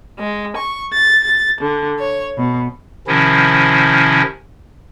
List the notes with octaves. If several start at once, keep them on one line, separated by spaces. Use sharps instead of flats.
G#3
C#6
A6
A6
D3
C#5
B2
C3 D#3 F3 C#4 E4